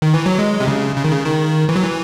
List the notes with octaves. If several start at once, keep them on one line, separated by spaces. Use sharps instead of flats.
D#3
E3
F#3
G#3
C3
C#3
C#3
D#3
C#3
D#3
E3
F#3
E3